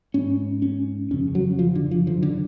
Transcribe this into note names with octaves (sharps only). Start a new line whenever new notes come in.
G#2 C#4
C#4
F2 C#3 C#4
F#3
F3
D3
F3
F#2 D3 F3
D3